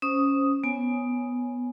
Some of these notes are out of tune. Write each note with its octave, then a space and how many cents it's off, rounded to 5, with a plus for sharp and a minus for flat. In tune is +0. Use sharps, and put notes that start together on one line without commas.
C#4 +0 C5 +0 D#6 +0
B3 +0 C#5 +0 G#5 +0